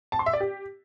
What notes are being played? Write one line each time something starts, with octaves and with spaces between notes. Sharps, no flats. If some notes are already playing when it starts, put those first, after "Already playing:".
A5
C6
E5
D5
G4